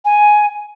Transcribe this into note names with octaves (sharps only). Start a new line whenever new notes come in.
G#5